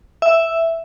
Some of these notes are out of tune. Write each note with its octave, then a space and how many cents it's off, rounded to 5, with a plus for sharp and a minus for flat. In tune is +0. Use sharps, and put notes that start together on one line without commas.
E5 +0